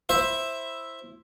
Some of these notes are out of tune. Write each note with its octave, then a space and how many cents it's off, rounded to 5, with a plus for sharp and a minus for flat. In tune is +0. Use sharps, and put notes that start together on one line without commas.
E4 +0 C5 +15 E5 +0